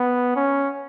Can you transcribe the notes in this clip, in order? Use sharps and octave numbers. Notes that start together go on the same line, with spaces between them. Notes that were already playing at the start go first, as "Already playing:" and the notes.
Already playing: B3
C#4